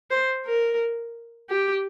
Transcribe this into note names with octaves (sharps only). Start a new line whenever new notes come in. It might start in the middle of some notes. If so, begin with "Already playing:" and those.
C5
A#4
G4